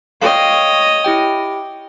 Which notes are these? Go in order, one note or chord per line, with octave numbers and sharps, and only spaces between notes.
C#5 D#5 F5 G5
E4 G4 G5